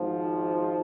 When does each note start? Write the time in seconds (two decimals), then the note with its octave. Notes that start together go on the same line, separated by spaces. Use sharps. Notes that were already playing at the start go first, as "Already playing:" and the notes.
Already playing: G#1 G#2 F3